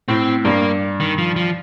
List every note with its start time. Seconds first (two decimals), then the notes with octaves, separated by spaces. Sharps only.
0.08 A2 C4
0.45 G2 A#3
1.00 D#3
1.18 F3
1.36 F3